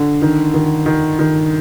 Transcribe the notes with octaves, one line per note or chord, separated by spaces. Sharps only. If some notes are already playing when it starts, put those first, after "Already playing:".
Already playing: D3
D#3
D#3
D#3
D#3